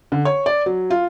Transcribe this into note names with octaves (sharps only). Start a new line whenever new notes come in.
D3
C#5
D5
F#3
F4